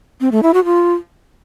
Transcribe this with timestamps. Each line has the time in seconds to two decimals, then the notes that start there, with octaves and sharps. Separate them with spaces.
0.21 C4
0.32 A3
0.43 E4
0.54 F#4
0.65 F4